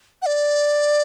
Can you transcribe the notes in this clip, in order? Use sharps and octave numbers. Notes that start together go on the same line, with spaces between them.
F#5
D5